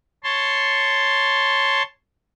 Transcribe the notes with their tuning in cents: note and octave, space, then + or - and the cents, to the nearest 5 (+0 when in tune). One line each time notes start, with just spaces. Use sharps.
C#5 +0 A5 +0 C6 +0